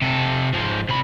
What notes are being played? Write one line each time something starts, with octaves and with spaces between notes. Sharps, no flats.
C3 A4
G#2 F3
C3 B5